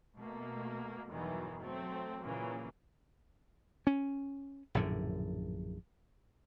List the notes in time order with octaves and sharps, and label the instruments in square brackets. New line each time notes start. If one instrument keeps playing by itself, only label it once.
[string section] B2 A3 A#3
E2 G2 B2 D#3 E3 F#3
F#3 A3 C4
A#2 C#3 E3 F#3 A#3
[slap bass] C#4
A#1 F#2 A2 D3